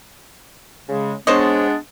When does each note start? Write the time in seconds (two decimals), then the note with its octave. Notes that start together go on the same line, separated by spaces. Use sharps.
0.89 C#3 G#3
1.27 G#3 B3 D4 C5 C#5 D#5